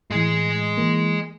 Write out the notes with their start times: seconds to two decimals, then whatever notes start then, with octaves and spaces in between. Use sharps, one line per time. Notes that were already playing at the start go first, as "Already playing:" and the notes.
0.11 A2 E3 G#3 G#4
0.77 E3 A#3